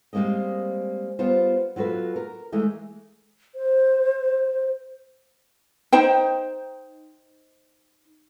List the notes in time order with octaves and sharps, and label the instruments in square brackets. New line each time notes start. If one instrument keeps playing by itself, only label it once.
[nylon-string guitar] G3 G#3 A#3 C4 D#5
G3 B3 F4 C5
F#3 F4 F#4 A4 B4
A#4
E3 G#3 A3
[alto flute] C5
[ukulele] D#4 C5 G5